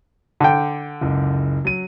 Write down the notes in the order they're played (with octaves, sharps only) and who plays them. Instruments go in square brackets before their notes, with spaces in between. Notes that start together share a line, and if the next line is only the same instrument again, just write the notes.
[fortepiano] D3 G5
[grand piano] F#1 C#2
F#3 D#7